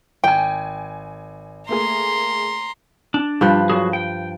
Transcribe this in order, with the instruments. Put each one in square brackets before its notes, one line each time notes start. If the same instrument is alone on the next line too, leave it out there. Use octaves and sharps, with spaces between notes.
[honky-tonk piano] G#1 G#5 [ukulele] G5
[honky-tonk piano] A3 A#3 G#4 [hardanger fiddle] A#5 C6
[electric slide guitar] D4
[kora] G2 F3 B4
[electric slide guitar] F#3 F#4 G#4
G5